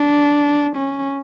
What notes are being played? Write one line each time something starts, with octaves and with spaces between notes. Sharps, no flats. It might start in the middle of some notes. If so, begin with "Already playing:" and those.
Already playing: D4
C#4